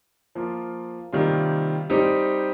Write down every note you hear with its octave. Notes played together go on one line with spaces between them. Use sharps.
F3 A#3 F4
C3 D#3 G3 A#3 F4
G3 C4 D#4 G4